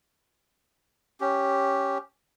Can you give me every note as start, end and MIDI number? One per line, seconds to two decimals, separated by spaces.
1.20 1.98 61
1.20 1.98 67